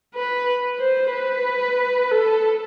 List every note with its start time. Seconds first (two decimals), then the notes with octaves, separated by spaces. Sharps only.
0.15 B4
0.80 C5
1.12 B4
2.11 A4